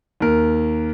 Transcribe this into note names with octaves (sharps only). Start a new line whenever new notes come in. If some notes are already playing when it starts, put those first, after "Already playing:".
D#2 A#4